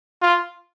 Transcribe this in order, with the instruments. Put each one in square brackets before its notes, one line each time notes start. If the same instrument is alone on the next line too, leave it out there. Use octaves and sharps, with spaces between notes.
[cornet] F4